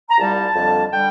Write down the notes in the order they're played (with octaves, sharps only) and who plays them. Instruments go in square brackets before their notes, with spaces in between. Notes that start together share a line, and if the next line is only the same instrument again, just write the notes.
[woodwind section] A#5
C2 A#2 G3 A5
F2 D3 G3
D3 G3 G5